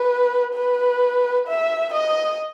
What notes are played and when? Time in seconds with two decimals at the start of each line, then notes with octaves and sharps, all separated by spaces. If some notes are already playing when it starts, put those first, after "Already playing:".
Already playing: B4
0.54 B4
1.47 E5
1.94 D#5